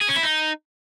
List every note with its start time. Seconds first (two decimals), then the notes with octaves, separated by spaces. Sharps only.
0.01 G#4
0.09 C#4
0.16 E4
0.23 D#4